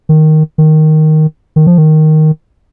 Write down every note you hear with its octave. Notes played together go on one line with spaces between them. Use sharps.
D#3
D#3
D#3
F3
D#3